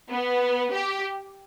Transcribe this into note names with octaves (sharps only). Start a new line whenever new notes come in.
B3
G4